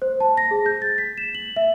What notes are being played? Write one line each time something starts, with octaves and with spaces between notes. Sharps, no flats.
C5
A5
A#6
G#4
G6
A6
B6
E7
F#7
E5